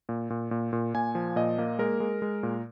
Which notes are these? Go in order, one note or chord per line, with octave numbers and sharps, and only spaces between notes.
A#2
A#2
A#2
A#2
A#2 G#5
F3
A#2 D#5
A#3
G#3 A#4
G#3
G#3
A#2